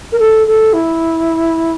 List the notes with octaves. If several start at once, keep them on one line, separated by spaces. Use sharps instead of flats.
A#4
A4
A4
E4